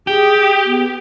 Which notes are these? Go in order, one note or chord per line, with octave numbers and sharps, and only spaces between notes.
G4 G#4
B3